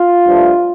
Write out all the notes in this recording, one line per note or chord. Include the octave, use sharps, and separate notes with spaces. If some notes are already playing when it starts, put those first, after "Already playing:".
Already playing: F4
G2 F3 A3